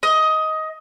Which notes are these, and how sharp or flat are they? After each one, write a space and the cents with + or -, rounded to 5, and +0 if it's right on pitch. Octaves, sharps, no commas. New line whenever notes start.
D#5 +15